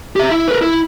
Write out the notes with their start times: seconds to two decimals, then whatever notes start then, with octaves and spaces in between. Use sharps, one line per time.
0.16 G4 E5
0.31 E4
0.48 A#4 B4
0.62 E4